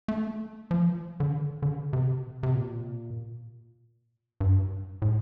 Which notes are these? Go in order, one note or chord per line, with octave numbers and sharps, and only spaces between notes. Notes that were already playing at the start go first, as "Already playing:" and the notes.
A3
F3
D3
D#3
D3
C3
C3
A#2
G2
A2